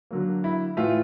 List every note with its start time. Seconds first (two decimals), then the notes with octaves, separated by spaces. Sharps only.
0.11 D3 F#3 A#3
0.44 E4
0.77 A2 E3 A3 F4